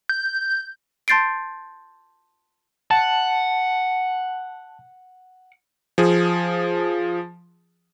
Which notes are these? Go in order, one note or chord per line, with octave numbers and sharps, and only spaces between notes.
G6
A5 C6 G6 A6 C7 D7
F#5 A5
F3 G#4